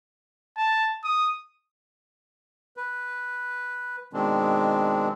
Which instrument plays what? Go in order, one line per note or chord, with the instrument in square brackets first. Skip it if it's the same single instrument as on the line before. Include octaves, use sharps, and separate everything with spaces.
[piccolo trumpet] A5
D#6
[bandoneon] B4
B2 D#3 G#3 C4 D4